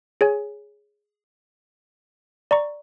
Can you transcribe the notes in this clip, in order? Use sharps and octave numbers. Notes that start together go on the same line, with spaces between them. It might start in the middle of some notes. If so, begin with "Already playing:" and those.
G#4 C#5 G#5
D5 A#5 C#6